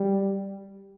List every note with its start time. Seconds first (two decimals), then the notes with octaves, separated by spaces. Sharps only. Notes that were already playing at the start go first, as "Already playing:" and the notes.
Already playing: G3